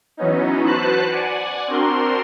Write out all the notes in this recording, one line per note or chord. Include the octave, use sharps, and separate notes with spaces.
E3 F#3 B3 C#4 D#4
F#4 B4 C5 A5 F#6
D5 F#5 G#5
C4 D4 F#4 A#4 C6